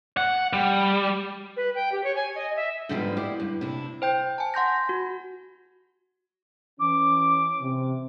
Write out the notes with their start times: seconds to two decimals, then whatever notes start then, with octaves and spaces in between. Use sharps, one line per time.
0.17 F#5
0.53 G3
1.57 B4
1.75 G5
1.92 G4
2.04 C#5
2.16 G#5
2.35 D#5
2.56 E5
2.89 G#2 D3 F3 G3 G#3 B3
3.17 E4 G4 D5 F5
3.40 G2
3.61 C3 D4 E4
4.02 C5 G5 G6
4.38 G#5 A5
4.54 F#5 C6 G6 A#6
4.89 F#4
6.80 E3 C#4 D6
7.61 C3